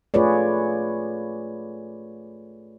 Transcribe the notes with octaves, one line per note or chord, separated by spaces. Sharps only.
A3 F4 G#4 B4 C#5 D5